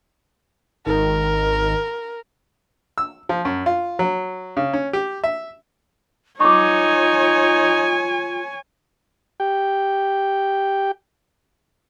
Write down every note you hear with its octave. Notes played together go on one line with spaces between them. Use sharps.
G#1 D#3 A#4
E6
F3
F#2
F4
F#3
C#3
C#4
G4
E5
D#4 F4 C#5 G#5 C#6 D6
G4 G5